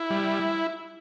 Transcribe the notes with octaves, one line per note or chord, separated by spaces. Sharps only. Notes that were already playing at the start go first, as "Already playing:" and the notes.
Already playing: E4
G3